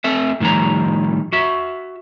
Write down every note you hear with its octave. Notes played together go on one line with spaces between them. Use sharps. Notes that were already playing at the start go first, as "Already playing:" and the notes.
A3 C4 A4 E5
A2 D#3 F3 G3 A#5
F#4 E5